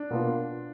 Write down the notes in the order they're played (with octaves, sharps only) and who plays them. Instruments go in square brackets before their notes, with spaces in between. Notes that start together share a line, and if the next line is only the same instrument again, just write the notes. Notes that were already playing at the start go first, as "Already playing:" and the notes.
Already playing: [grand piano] D4
[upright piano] B2 A#3 F4 B4